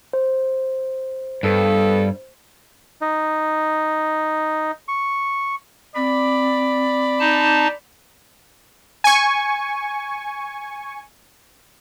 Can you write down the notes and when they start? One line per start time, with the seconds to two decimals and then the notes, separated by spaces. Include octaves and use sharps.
0.13 C5
1.43 G2 B3 A4
3.01 D#4
4.88 C#6
5.96 C4 D5 B5
7.19 D#4 A5
9.04 G#5 C#6